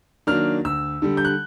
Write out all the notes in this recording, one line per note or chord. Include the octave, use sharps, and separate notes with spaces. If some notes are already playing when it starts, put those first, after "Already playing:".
D#3 F#3 A#3 D4 F6
D2 E6
D3 G3
G6
F#6